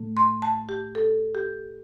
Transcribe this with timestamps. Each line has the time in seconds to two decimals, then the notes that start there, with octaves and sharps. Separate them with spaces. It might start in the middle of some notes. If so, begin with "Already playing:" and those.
Already playing: A2 A3
0.17 C6
0.42 A5
0.69 G4
0.95 A4
1.35 G4